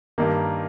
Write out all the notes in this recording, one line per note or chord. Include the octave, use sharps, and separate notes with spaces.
G2 D#3 A#3